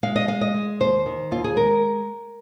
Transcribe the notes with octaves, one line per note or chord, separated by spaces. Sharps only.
G#3 F5
D#5
G#3 F5
D#5
G#3
D#2 C5
D#3
D#2 F4
G#4
G#3 A#4